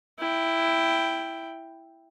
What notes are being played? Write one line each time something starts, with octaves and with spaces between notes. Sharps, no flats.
E4 G5